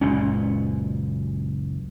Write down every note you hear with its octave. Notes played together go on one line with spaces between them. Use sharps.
F#1 C#2 A#2 C#4